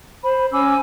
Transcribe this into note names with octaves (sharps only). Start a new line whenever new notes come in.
C5 B5
C#4 G#5 D6 E6